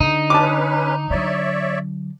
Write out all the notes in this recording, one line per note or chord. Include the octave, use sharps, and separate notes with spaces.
D3 D#4
C#4 B4 A5 D6
D3 F#3 C#5 D5 E5